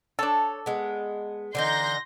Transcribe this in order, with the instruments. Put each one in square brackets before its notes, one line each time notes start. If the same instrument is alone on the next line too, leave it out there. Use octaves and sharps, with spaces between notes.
[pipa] D4 A4 [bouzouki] C#5
[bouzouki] G#3 B3
[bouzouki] D3 E3 D#4 [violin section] C6 G6 A#6